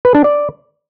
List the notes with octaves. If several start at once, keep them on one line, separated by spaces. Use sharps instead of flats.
B4
D4
D5